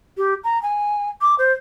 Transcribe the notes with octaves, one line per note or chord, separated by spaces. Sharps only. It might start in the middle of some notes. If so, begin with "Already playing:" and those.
G4
A#5
G#5
D6
C5